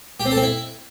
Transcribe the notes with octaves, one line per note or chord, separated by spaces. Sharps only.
G4
C4
A4
C4
E4